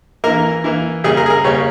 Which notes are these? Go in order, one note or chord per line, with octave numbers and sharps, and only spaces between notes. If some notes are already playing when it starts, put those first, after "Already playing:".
E3 A#3 A#4
E3 A#3
C#3 G3 A#3 G#4
A#4
G#4
A#4
C#3 G3 A#3 C#5